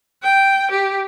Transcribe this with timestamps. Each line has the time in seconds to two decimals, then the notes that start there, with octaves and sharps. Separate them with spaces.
0.23 G5
0.71 G4